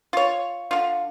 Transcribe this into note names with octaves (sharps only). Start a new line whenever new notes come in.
F4 C#5
D3 F4